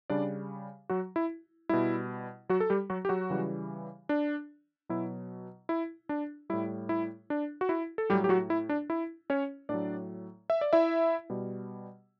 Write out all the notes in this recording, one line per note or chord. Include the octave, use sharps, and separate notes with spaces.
C#3 G3 D4 D5
F#3 F#4
E4
B2 G3 E4
F#3 F#4
A4
G3 G4
F#3 F#4
G4
F#3 F#4
C#3 E3 G3
D4
B2 F#3 E4
E4
D4
A2 G3 E4
E4
D4
F#4
E4
A4
A2 F#3 G3 G4
G4
F#3 F#4
E4
D4
E4
C#4 C#5
A2 F#3 D4 D5
E5
D5
E4 E5
B2 G3